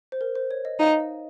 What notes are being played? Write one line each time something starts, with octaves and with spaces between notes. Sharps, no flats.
C5
A#4
C5
C#5
D#5
D#4 F5
D#5